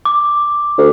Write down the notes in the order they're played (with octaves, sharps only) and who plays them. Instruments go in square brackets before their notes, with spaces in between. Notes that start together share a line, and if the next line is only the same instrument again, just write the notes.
[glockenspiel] D6
[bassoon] D2